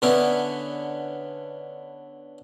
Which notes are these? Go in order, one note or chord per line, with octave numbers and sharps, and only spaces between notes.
D3 B3 C#4 E4